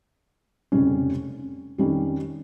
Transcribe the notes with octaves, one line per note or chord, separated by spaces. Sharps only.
F1 F2 C#3 G3 C#4
F2 D#3 G3 C#4 G4